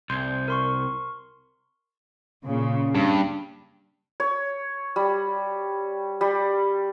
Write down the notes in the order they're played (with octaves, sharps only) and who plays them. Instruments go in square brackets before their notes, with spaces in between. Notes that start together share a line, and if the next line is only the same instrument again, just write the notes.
[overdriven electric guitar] C2 [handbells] C6 G6
[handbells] A#4 C6 C#6
[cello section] A#2 C#3
[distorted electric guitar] G2
[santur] C#5
G3
G3